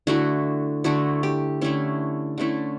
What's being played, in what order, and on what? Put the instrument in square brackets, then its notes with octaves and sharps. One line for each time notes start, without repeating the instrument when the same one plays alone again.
[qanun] D3 A3 E4 F#4
D3 A3 E4 F#4
G4
D3 A3 C#4 E4
D3 A3 C#4 E4